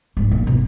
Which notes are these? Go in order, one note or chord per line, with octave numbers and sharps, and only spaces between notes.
G#2
A#2
B2